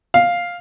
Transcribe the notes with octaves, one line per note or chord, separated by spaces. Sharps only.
F5